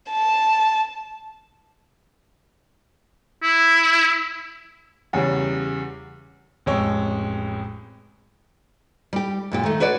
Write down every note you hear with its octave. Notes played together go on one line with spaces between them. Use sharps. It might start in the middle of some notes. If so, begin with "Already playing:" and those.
A5
E4
E2 C#3 G3 C#4
A1 F2 G#3 C#5 G5 E6
G3 G4
F#2 A#2 G4
D#3 A3
F#4 B4 C#5 D5